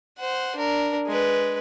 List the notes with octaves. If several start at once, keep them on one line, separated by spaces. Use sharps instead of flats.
C5 F#5
D4 A#4
G#3 B4